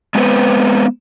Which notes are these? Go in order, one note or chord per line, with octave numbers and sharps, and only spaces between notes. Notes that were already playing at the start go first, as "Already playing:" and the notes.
G#3 B3 C4 G#4 B4 C5